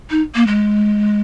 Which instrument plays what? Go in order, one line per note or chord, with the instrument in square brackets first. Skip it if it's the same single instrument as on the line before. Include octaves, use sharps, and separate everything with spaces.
[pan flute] D#4
A#3
G#3